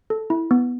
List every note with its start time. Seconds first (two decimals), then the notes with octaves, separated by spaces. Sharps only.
0.10 A4
0.30 E4
0.51 B3